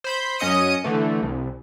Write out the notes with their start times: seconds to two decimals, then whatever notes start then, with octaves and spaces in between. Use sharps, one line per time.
0.04 C5 B5 G6
0.39 F#2 C#4 D#5 D#6 C#7 D#7
0.84 D3 E3 A3
1.22 C2